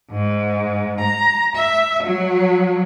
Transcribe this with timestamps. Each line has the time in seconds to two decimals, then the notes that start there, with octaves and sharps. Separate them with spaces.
0.11 G#2
0.99 A#5
1.55 E5
2.03 F#3